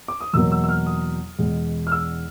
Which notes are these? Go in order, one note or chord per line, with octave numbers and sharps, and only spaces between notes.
D6
D#6
E2 B2 F#3 A#3 E6
E6
E6
F6
D#6
E2 B2 G#3
F6
E6